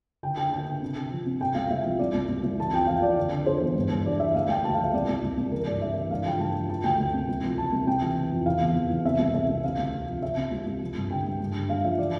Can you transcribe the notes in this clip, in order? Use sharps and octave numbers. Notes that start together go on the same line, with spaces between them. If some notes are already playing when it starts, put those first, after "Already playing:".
D3 G5
D3 G5
D3 G5
D3
C3
C3
F3
C3
C3 G5
C2 F5
C2 E5
F3
C2 D5
C2
C2
C2
E3 A5
F2 G5
F2 F5
F2 D5
D3
D3
D3 C5
E2
G2
G2
E3 D5
E3 E5
D2 F5
D2 G5
D2 A5
F5
F3 E5
C2 D5
C2
C2
C2
E3 A#4
G2 D5
E3 E5
E3
G2 F5
F3 G5
G2 A5
F3
F3 A5
D2 G5
D2
C3
C2
F3
F3 A5
C2
C3 G5
E3
E3
F2
E3 F5
E2
E3
E2
C3 E5
C2
C2 E5
C3
C3 F5
D2
C3
F3
C3 E5
C3
C2
C2
F3
G2
D3 G5
G2
G2
G2
G2 F5
F3 E5
E3 D5